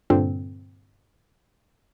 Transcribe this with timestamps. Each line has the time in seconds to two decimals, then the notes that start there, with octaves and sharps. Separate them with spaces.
0.10 G2 A#2 D3 C4